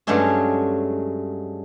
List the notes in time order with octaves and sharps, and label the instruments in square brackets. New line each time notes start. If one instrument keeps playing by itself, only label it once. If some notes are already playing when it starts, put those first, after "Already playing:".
[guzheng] G2 F#3 G#3 A3 C#4 G#4